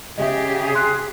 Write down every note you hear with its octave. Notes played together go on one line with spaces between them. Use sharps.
C#3 G4 G#4 D#5 E5
C6 F#6